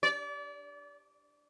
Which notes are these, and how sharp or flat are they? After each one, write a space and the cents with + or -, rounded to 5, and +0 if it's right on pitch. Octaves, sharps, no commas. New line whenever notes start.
D5 -30